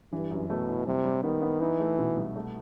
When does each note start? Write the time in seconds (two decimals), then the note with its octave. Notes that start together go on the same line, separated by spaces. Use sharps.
0.12 G2 E3
0.31 F#2
0.49 B2 A3
0.68 E4
0.86 C3 G3
1.04 G3
1.23 D#3 B3
1.42 B3
1.60 E3 D#4
1.80 A3
1.99 B2
2.17 C2
2.36 A3